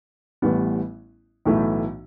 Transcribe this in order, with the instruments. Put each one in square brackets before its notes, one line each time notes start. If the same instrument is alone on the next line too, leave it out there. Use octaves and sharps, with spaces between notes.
[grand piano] A1 A2 G3 B3
B1 A2 E3 A3 E4